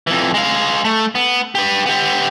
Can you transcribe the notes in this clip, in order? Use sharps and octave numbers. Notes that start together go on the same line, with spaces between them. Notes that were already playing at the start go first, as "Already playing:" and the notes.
F2 E3
G#3 F5
A3
B3
G4 B4
B3 G4